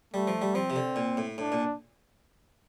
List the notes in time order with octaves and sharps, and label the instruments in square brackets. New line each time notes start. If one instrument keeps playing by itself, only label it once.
[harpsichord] G3 [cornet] A3
[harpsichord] F3
G3
[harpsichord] F3 [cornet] C4
[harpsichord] C3
D3
A#2
A2
[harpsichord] A2 [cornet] D4
[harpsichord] A#2